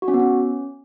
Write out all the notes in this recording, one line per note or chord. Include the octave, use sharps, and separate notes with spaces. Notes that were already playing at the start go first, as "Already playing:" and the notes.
F#4
C#4
B3
C#4